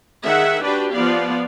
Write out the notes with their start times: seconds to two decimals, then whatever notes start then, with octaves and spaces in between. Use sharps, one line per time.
0.24 D#3 G#4 E5 F#5
0.62 D4 F#4 G4 B4 D5
0.94 F3 B3 D5 F5